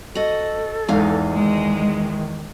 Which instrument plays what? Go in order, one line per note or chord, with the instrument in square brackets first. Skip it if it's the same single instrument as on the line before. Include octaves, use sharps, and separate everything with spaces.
[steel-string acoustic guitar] F#4 C5 D#5 [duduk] A4
[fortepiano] E2 G#2 [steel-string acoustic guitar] D#4 F5 G#5
[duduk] D#3 [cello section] G#3